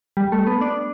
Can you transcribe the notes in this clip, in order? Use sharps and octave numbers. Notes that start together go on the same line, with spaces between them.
G3
A3
B3
D4